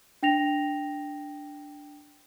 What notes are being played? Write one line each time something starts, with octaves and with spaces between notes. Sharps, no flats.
D4 G5 A#6 F7